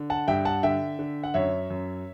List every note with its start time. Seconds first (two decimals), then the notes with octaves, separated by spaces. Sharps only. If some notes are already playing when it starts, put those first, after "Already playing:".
Already playing: D3
0.10 F#5 A5
0.28 G2 E5 G5
0.45 F#5 A5
0.63 D3 E5 G5
0.99 D3
1.24 F#5
1.34 F#2 C#5 E5
1.70 F#2